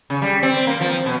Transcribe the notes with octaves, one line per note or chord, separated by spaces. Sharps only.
C#3
G3
C4
A#3
F3
B2